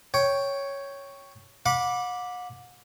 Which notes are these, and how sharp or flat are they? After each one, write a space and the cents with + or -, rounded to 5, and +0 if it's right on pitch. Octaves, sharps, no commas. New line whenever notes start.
C#5 +0 G5 +0
F#5 -40 B5 -5 D6 +0